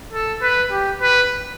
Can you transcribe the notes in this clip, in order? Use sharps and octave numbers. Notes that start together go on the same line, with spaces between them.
A4
B4
G4
B4